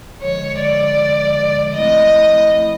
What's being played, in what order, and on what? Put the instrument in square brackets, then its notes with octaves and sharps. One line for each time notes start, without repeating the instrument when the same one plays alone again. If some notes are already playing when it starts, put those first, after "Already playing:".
[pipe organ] D3 F3 G#3 [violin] C#5
[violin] D5
[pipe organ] F3 A3 C4 E4 [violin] D#5